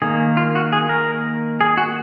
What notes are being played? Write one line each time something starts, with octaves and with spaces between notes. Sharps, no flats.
D#3 A#3 G#4
F4
F#4
G#4
A#4
G#4
F#4